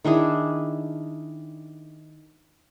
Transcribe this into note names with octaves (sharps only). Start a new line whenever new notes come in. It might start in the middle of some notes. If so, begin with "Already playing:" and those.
D#3 D4 E4 G#4